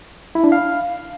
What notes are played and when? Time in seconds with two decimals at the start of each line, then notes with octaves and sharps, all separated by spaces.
0.35 E4
0.44 D4
0.52 F5